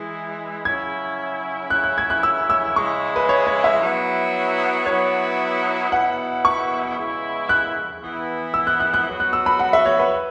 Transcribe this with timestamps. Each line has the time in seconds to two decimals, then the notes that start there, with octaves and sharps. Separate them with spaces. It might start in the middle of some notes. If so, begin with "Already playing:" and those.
Already playing: E3 G#3 E4
0.65 C#3 F#3 C#4 E4 G#6
1.70 C#3 F#3 C#4 E4 F#6
1.84 F#6
1.98 G#6
2.10 F#6
2.23 E6
2.50 E6
2.76 C#3 G#3 E4 C#6
3.16 B4
3.29 C#5
3.47 C#5
3.64 E5
3.81 F#3 B3 E4
4.86 F#3 B3 E4 C#5
5.92 B2 B3 E4 F#5
6.45 C#6
6.97 C#3 G#3 B3 E4
7.49 F#6
8.02 E3 B3 E4
8.54 E6
8.67 F#6
8.80 F#6
8.94 F#6
9.07 F#3 B3 F#4
9.20 F#6
9.33 E6
9.46 B5
9.59 F#5
9.73 E5
9.85 C#5
9.99 B4